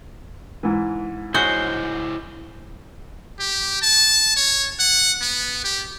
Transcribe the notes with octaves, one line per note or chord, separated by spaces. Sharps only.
G#2 E3
G#3 E4 F#4 C5 C#5 G6 C7
G4
A5
C#5
F#5
B3
G4